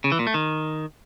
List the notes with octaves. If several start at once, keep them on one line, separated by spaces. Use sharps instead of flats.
C#3
E3
A#2
A3
D#3